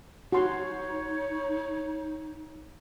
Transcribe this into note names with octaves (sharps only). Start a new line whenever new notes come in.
D#4 F#4 C#5 C6